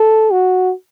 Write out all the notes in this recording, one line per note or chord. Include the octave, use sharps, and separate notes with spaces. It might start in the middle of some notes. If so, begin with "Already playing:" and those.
Already playing: A4
F#4